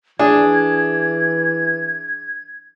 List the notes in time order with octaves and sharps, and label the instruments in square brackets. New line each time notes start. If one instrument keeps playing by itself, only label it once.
[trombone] E3 [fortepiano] D4 [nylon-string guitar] G#4 [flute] G#6